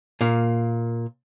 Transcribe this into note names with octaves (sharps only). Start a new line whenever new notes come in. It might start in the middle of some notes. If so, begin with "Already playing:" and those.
A#2 A#3